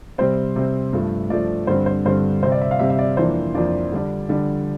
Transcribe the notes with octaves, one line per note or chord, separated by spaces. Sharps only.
C3 G3 C4 C5
C3 G3 C4
G2 F3 A3
G2 F3 A3 D5
G2 D3 G3 C4 C5
C5
G2 D3 G3 C4 C5
C3 G3 C4 C5
D5
E5
F5
C3 G3 C4 E5
E5
D5
F2 E3 A#3 D4 C5
F2 E3 A#3 D4 D5
D3 G3 D4
D3 G3 D4